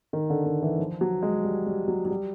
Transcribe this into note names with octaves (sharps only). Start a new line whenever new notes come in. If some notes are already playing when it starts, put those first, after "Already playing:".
D#3
D3
D#3
E3
F3
F#3
G#3
G3
G3
F#3
F#3
G3